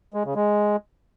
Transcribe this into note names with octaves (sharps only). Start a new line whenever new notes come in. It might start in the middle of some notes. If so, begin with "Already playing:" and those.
G#3
C#3
G#3